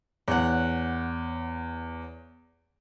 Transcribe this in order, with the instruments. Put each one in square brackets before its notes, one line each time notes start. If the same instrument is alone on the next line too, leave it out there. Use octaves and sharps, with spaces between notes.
[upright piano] E2 [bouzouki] C#5 F#5